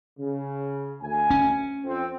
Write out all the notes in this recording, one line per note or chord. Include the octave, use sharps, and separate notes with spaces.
C#3
D2 G#5
C#4
F2 C4